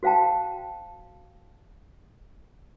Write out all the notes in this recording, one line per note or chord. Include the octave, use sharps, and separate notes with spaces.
F#4 C5 F5 G5 A5